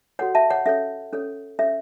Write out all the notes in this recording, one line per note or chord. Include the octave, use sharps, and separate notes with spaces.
F#4 A4 C#5 F#5
E5 A5
C#5 F#5
C#4 A4 C#5 E5
C#4 A4 C#5
C#4 A4 C#5 E5